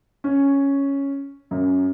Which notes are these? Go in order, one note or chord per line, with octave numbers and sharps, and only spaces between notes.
C#4
F#2